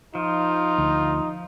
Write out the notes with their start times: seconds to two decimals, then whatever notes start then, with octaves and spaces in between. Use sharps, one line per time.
0.15 F3 D#4 F4
0.78 D2